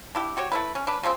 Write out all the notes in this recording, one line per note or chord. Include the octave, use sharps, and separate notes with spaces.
D4 E4 G4
F#4 G4 C#5
A3 E4 B4
C#4
D4 B4
C#3 F3 A3 C4